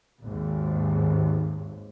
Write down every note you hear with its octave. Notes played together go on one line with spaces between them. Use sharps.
G#1 D#2